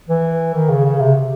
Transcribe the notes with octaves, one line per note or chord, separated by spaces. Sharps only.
E3
D#3
C#3
C#3
C3